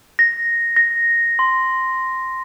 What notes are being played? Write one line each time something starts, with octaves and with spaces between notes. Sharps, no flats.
A#6
A#6
C6